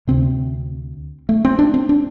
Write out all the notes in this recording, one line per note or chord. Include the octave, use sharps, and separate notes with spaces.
D2 C3 C4
A3
C4
D4
C4
D4